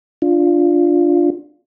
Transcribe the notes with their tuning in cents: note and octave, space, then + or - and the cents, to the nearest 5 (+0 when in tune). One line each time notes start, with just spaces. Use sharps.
D4 +0 F4 +0